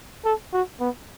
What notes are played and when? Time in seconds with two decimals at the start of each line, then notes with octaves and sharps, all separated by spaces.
0.25 A4
0.53 F#4
0.80 B3